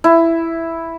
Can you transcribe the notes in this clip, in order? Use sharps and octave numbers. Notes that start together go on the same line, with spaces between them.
E4